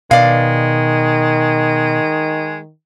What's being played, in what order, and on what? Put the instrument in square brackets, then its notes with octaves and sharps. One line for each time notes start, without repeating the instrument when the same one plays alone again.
[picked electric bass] B2 [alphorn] D#3 [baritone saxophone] G#3 [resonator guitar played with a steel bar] D5 F5